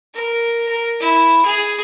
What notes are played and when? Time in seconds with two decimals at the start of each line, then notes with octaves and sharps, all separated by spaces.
0.14 A#4
0.69 A#4
1.00 E4
1.45 G#4